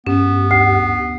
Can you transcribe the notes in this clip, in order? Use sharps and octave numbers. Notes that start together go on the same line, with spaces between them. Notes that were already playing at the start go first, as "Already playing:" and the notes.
G2 B3 C#4 G4
D2 C7